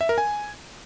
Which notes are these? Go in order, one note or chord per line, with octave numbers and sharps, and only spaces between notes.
E5
A#4
G#5